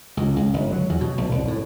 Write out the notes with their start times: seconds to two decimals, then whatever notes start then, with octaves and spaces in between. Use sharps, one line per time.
0.17 C#2
0.36 C#2
0.54 G1
0.72 F#3
0.89 E2
1.01 B2
1.18 B1
1.31 C2
1.48 A2